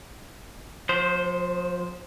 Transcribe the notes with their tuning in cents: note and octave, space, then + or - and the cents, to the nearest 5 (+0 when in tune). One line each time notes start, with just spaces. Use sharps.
F3 +40 C5 +0